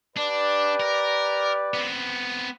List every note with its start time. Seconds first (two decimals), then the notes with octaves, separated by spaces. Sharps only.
0.17 D4 G4 B4 D5
0.80 A#4
1.74 B3 C4